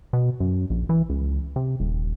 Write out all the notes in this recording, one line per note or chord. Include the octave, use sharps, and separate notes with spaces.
B2
F#2
A#1
E3
C#2
C3
D#1